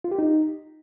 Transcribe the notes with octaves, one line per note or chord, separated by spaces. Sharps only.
F4
G4
D#4